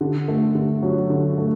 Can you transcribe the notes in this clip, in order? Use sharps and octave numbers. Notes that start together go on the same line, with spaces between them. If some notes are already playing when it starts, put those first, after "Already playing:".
D3
A3
D3
F#3
D3
A3